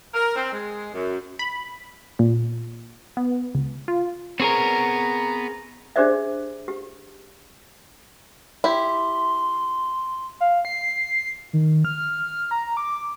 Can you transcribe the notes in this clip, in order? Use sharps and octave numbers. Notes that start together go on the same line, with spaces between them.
A#4
C4
G#3
F#2
B5
A#2
B3
C#2
F4
B3 C4 G#4 A#4 C#5 A#5
D4 G4 G#4 C5 D5 E5
G4
E4 G4 C6
F5
C7
D#3
F6
A#5
D6